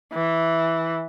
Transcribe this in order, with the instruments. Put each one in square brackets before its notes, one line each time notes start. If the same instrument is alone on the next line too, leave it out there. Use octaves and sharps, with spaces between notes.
[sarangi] E3